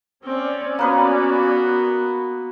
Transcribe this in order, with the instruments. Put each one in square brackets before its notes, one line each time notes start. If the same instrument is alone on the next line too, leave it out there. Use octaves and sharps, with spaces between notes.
[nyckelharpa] C4 [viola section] C#4 D5
[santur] A#3 B4 D#6 [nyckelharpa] B3 F#4